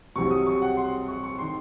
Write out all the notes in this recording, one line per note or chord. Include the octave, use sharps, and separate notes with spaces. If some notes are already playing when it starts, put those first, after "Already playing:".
C2 C3 F#3 C#6
D#6
C#6
F#5
C6
C#6
C#6
D#3 C6